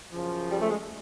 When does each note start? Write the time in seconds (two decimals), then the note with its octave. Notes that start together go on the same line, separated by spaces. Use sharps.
0.12 F#2 C#3 F3
0.51 G3
0.62 A3
0.70 G#3